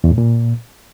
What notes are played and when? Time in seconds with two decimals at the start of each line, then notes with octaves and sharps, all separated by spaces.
0.04 E2
0.11 A2
0.18 A#2